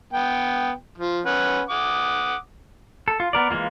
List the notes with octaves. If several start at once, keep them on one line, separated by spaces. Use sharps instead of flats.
B3 G5
F3
C#4 B4 F#5
F#5 D6 D#6
A4
F4
B3 A#4 D5
E3 G#3 A#3 F4